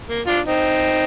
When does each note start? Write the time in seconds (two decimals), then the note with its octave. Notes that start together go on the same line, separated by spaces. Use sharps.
0.09 A#3
0.27 D4 F4
0.45 C4 D#4